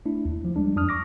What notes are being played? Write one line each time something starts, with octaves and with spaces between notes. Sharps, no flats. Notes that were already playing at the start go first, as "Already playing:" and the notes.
A3 D4 E4
D#2
F3
G3 G#3 D4
F2 D4 D#6 F6
C#6 D6 A#6